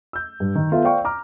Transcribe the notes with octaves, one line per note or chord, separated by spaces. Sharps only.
E6 G6
G2
D#3
B3 F4 A4 E5
C5 D5 F5 G5 C#6
A#5 D6 F6